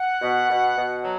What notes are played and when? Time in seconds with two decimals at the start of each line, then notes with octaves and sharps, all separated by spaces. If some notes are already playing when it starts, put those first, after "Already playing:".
Already playing: F#5
0.21 B2
0.49 B2
0.77 B2
1.04 F#3